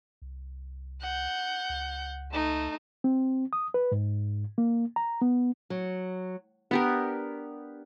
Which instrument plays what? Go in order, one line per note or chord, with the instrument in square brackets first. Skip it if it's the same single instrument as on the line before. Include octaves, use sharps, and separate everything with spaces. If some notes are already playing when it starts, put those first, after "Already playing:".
[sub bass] C2
[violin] F#5 G6
[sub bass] C#2
[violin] A3 D#4
[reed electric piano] C4
D#6
B4
G#2
A#3
A#5
B3
[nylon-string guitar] F#3
[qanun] B3 G4 A#4 [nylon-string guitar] D4